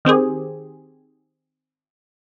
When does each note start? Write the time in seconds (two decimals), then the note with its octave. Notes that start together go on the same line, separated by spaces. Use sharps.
0.05 D#3 C4 G4 G#4